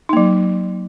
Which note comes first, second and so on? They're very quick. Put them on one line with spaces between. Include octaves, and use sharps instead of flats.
D#4 A#3 F#3